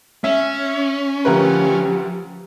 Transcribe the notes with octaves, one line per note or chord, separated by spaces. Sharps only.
C#4 E5
D2 F3 G4 A#4 B4